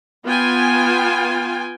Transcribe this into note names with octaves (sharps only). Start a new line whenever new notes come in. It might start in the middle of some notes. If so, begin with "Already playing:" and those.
B3 F4 G5 G#5